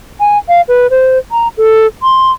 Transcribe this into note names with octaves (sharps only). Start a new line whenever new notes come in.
G#5
F5
B4
C5
A#5
A4
C6